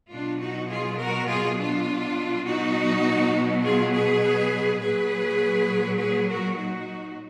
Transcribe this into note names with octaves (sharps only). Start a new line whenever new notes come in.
B2 F#3 D4 F4
D#4 F#4
F4 G#4
F#4 A#4
F4 G#4
D4 F4
B2 F#3 D#4 F#4
F4 G#4
G#4 B4
A#2 F#3 G#4 B4
G#4 B4
F#4 A#4
D#4 F#4